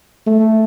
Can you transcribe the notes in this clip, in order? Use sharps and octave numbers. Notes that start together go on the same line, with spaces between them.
A3